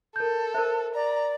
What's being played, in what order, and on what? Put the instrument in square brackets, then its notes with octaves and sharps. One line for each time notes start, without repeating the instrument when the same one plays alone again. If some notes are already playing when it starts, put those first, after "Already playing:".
[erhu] A4 [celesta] A#4 G6
[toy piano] A#4 C5 [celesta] E5
[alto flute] D5 [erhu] A#5